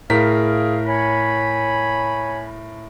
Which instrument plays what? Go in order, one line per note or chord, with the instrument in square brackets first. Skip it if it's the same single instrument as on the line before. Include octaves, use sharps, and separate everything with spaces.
[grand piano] A2 A#4 B6 [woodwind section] G#4 F5
[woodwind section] C#5 G#5 B5